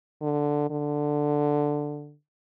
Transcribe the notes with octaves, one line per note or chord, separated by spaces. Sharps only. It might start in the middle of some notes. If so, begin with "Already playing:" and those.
D3
D3